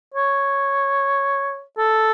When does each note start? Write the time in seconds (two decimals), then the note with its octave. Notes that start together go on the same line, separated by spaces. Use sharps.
0.14 C#5
1.78 A4